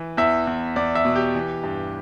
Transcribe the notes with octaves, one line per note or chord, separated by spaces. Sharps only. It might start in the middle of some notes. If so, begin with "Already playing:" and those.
Already playing: E3
E2 E5
E2
E2 D5
E5
B2
G4
E3
G2